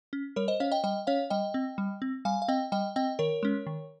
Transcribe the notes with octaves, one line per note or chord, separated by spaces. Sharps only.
C#4
G3 A#4 C#5
C5 D#5
C#4 C#5 F5
D#5 G5
G3 D#5 G5
C#4 C#5 F5
G3 D#5 G5
C4
G3
C4
G3 F5 G#5
F5
C4 D#5 G5
G3 D#5 G5
C4 D#5 G5
D#3 A#4 C#5
G#3 C#4
D#3